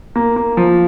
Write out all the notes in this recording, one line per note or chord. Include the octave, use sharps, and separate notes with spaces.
A#3
A#3
F3